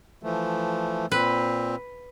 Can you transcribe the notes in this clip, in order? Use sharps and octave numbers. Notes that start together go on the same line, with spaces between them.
E3 F3 A3
A#2 C4 B4